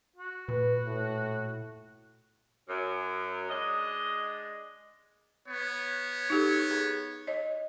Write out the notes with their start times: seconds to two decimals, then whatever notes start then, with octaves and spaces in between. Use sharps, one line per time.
0.16 F#4
0.48 A#2 B4
0.86 A2
2.69 F#2
3.49 G#3 D4 D#5
5.48 B3 C#5
6.30 D#4 G4 A4
6.71 G#4
7.27 C#5 D#5